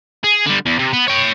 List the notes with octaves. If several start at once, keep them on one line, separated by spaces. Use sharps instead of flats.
G#4
D3 G3
E2
C3
B3
C#5 G5